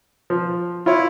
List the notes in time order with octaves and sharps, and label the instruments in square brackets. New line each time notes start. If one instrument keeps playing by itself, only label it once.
[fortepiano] F3
[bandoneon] E4 [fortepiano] F4 C#5